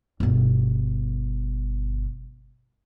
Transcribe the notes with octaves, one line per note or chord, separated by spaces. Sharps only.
G1 B2